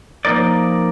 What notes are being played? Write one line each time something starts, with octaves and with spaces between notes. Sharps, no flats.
F3 A#3 D#4 A#4 D5